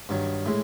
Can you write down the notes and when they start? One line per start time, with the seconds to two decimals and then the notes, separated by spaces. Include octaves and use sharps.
0.09 G2 D#3 F#3
0.46 A2 E3 G#3